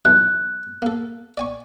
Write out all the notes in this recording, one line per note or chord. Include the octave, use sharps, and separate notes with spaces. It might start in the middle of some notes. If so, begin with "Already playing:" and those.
B1 E3 A5 F#6
A#3 A4
D5 G#5 C#6